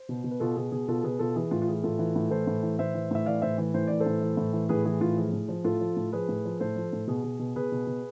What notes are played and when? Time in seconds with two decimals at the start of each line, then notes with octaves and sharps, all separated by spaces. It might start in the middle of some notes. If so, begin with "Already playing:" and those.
Already playing: C5
0.09 B2
0.24 B2
0.31 B4
0.40 B2 F4 A4
0.56 B2 G#4
0.72 B2 G#4
0.88 B2 F4 A4
1.04 B2 G#4 B4
1.19 B2 F4 A4
1.36 E3 G#4
1.51 A2 F4
1.62 F4
1.68 E3 G#4
1.84 A2 F4 A4
1.99 E3
2.16 A2
2.31 E3 A4 C5
2.47 A2
2.63 E3
2.79 A2 C5 E5
2.94 E3
3.11 A2 E5
3.26 E3 D5 F5
3.42 A2 C5 E5
3.58 E3
3.74 A2 C5
3.87 E3 D5
4.00 A4 C5
4.06 A2
4.21 E3
4.37 A2
4.53 E3
4.69 A2 G#4 B4
4.85 E3 G#4
5.01 A2 F4
5.17 F3 G#4
5.33 A2
5.49 F3
5.64 A2 F4 A4
5.81 F3
5.97 A2
6.12 F3 G#4 B4
6.29 A2
6.45 F3
6.60 A2 A4 C5
6.76 F3
6.93 A2
7.07 B2 G#4
7.24 B2
7.39 B2
7.56 B2 G#4 B4
7.72 B2
7.87 B2